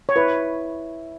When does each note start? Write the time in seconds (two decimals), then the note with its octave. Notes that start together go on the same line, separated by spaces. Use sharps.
0.09 C#5
0.16 E4 B4